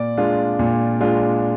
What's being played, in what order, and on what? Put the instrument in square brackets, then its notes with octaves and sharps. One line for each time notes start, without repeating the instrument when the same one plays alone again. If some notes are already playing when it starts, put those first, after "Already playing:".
Already playing: [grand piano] A#2 D5
G#3 D4 F4
A#2
G#3 D4 F4